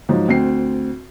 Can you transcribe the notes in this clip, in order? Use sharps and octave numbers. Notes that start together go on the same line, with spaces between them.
G#2 F3 F#3
D2 C4 C7